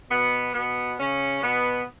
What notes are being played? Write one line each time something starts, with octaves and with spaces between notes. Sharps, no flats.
B2 B3
B2 B3
C#3 C#4
B2 B3